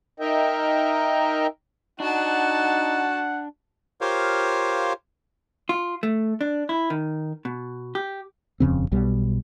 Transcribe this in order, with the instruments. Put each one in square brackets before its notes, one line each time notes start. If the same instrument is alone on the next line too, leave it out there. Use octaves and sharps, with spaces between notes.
[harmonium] D#4 A#4 D#5 E5 G5
[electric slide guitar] D4 [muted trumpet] D#4 [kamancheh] F#4 A5 [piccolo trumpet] F#5
[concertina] F4 G4 A#4 C5 C#5 F5
[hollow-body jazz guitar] F4
A3
D4
E4
D#3
B2
G4
[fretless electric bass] D#1 F2 C#3 C4
B1 B2 G3